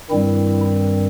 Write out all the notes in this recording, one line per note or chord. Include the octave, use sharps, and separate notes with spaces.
G2 D#3 G3 C4 E4